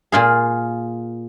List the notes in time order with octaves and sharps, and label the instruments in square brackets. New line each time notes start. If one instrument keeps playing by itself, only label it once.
[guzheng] A#2 F4 G#4